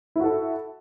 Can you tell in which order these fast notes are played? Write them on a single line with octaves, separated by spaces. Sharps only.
E4 F#4 A4